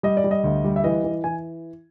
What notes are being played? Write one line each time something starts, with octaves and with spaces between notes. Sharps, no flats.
G3 D#5
D5
G3
D#5
D2
G3
E5
E3 D#5
E3
E3 G#5